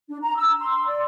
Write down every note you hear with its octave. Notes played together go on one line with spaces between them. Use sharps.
D4
A#5
E6
C6
D5